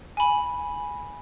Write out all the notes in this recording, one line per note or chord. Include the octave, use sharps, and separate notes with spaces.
G#5 B5